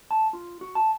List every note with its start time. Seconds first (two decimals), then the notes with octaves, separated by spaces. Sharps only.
0.11 A5
0.33 F4
0.61 F#4
0.75 A5